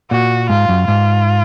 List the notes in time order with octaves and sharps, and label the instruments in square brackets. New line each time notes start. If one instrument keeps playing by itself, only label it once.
[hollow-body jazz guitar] A#2 [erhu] F#4
[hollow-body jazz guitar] G#2 [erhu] F4
[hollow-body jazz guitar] F#2
[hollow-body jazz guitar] G#2 [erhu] F4